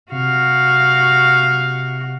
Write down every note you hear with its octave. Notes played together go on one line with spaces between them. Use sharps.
C3 F#4 F5